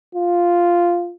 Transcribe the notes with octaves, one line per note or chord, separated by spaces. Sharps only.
F4